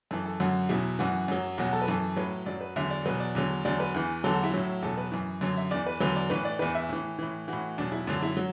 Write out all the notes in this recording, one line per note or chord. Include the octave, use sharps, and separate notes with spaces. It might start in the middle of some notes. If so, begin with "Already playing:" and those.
F#2 E3 A4
A4
F#2 D3 F#3 F#4
E2 B2 F#3 E4
F#2 E3 F#4
F#2 F#3
E2 B2 F#3 F#4
A4
B4
F#2 E3 A4
A2 F#3 B4
F#2 F#3 D5
B4
E2 D3 F#3 E5
D5
E2 B2 F#3 B4
D5
E2 D3 F#3
E2 D3 F#3 D5
B4
E2 E3
E2 D3 F#3 A4
F#4
E4
A2 F#3
E2 B2 F#3 A4
B4
F#2 E3
F#2 D3 F#3
E5
E2 E3 D5
B4
E2 D3 F#3 B4
D5
A2 E3 B4
D5
E2 E3 B4
E5
A2 E3
A2 E3
A2 E3 F#4
E2 B2 F#3 D4
E4
F#2 D3 F#3 D4
E4
F#3